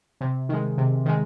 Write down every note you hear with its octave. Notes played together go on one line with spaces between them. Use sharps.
C3
D#3 G#3
C3
D#3 G#3